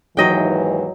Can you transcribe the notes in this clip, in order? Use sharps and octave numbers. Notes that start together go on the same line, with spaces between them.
D#2 G#2 E3 F#3 D#5 G5